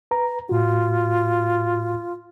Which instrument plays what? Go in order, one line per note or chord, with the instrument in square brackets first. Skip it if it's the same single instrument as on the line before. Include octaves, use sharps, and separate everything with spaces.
[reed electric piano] B4 A#5
[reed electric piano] A2 F#4 [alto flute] F4